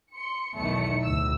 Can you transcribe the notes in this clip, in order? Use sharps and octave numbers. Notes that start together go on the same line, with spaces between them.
C6 C#7
B1 E2 D#3 A3 C#7
D2 A2 E6